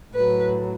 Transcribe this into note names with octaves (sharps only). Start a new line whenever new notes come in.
A2 F#3 B4